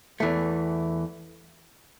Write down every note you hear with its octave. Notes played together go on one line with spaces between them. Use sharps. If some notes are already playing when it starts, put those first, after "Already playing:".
E2 E3 A3